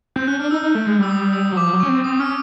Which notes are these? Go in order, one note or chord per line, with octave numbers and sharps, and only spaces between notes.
C4 G6
C#4 F#6
D4 F6
D#4 E6
D#4
A3
G#3
G3 E6
D#6
E6
F#3
F3 D6
F#3 D6
C#4 C#6
C4
C4 D#6
C#4 F6